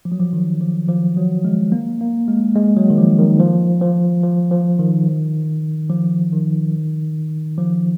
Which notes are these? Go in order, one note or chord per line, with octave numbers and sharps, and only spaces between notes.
F3
F#3
F3
D#3
F3
F3
F#3
G#3
A#3
A#3
G#3
G#3
F#3
D#3
F3
D#3
F3
F3
F3
F3
D#3
F3
D#3
F3